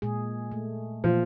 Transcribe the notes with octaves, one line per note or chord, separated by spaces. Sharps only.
A#2 G#3 G#4
A3
A#2 F3